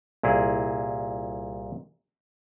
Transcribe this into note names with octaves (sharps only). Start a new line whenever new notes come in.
C2 A#2 E4 G#4